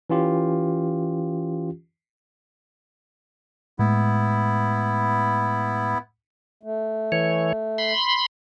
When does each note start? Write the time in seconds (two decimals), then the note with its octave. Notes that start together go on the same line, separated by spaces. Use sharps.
0.10 E3 C#4 F4 G4
3.79 A2 G#3 A3 B3 E4
6.63 A3
7.12 E3 C#5
7.78 B5 C6